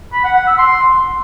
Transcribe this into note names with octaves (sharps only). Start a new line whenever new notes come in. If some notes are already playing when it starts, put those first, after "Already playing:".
B5
F#5
F#5
E6
C6